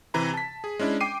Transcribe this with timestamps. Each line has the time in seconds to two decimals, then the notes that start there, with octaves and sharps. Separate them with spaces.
0.14 C3 E3 A#5 B5
0.34 A5 B6
0.64 G#4
0.79 G#3 C#4 D4 E4
1.00 G5 D6 C7 D#7